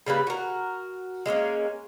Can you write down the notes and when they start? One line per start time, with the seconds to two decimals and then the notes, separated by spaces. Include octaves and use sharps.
0.06 C#3 G3 A#3 B4
0.27 F#4 A#4
1.26 G#3 A#3 C4 C#4